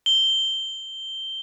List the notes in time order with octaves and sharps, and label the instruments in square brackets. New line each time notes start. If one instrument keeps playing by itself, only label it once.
[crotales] G7